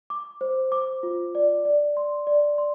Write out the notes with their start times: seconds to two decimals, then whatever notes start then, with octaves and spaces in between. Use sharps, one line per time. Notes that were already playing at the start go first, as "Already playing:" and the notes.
0.10 D6
0.41 C5
0.72 D6
1.03 F4
1.35 D5
1.65 D5
1.97 C6
2.27 D5
2.58 C6